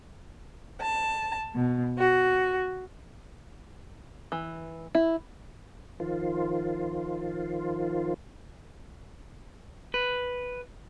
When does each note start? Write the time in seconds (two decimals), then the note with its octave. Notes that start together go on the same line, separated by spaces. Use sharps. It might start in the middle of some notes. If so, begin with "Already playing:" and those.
0.80 A5
1.53 B2
1.97 F#4
4.32 E3
4.95 E4
6.00 D#3 F3 F4
9.94 B4